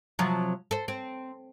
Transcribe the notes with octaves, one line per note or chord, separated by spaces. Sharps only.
C3 F3 F#3
A4 C5
C4